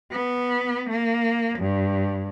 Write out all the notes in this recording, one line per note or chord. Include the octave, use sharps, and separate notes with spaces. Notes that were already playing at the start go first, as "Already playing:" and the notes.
B3
A#3
G2